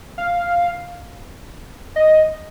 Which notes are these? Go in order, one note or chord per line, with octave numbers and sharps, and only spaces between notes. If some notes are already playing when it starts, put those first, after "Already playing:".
F5
D#5